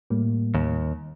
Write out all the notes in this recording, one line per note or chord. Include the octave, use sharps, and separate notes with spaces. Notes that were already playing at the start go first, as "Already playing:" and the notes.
A2 G3 A#3
D#2